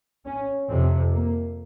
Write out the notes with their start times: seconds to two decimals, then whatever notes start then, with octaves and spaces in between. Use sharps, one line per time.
0.26 C#4
0.69 F2 C3 C4
1.13 A#3